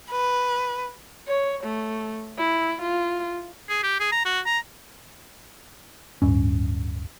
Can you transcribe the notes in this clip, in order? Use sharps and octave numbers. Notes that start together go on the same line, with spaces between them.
B4
C#5
A3
E4
F4
G#4
G4
G#4
A#5
F#4
A#5
D1 G2 C#4